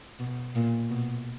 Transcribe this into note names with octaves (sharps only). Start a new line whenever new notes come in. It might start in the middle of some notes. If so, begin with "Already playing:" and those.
B2
A#2
B2